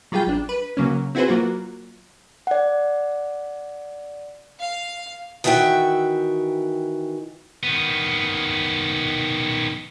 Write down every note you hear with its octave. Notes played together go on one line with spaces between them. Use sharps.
F#3 G3 F4 G#4 G5
A1 D4
B4
C#3 F#3 A#3 C#4
C4 E4 F#4 G#4 B4 C5
F#3 A#3 F4 F#4
D5 F#5
F5
D#3 E3 F#4 E5 G5
D#3 B3